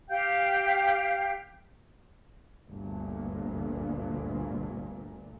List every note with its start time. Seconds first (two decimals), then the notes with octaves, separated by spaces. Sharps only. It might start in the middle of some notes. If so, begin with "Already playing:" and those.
0.09 G4 F5 G5 G6
2.68 G1 D2 A#2